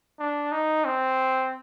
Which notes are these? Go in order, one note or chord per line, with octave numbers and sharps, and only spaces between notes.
D4
D#4
C4